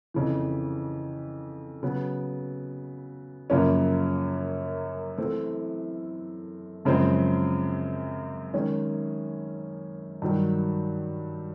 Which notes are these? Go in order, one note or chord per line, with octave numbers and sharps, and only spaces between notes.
F2 C#3 E3
C#3 F#3 B3
F#2 C#3 F3 A#3 C#4
E3 A3 C4 E4
F#2 C#3 F3 G#3 C4
D#3 G#3 C#4
G2 D#3 F#3